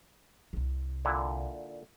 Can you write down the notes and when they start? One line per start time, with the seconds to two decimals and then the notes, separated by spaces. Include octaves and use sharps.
0.53 C2 C3
1.05 A#2 D3 E4